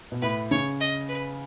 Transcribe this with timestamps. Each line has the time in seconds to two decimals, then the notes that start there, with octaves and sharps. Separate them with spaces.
0.12 B2
0.22 A2 B4
0.51 C#3 C#5
0.80 D#5
1.08 B4